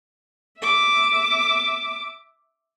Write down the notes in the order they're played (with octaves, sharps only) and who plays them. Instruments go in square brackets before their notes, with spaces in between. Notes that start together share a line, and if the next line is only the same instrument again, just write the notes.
[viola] E5 D6